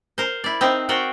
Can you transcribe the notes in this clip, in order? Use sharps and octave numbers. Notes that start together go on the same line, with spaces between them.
A#4 C5
E4 D5
C4 D#4 A#4 E5
F#4 A#4 C5 D5 G5